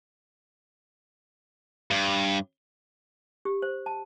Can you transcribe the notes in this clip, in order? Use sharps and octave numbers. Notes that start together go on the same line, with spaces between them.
G2
G4
C5
A5